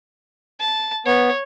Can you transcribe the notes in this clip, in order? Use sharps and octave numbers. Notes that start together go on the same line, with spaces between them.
A5
B3 C#5